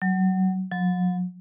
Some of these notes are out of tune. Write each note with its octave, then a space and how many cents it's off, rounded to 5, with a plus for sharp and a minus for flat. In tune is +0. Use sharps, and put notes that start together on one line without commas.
F#3 +25
F#3 -40